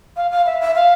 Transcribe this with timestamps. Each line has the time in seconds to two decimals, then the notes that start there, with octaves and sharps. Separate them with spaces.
0.16 F5
0.31 F5
0.45 E5
0.60 E5
0.75 F5